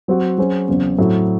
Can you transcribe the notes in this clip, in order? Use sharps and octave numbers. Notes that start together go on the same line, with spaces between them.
F#3 C4 F#4
F#3 C#4 G#4 C5
E2 C#3 F#3 C4
A2 F#3 C4 F#4 A4